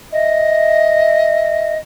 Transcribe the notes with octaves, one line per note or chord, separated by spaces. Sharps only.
D#5 E5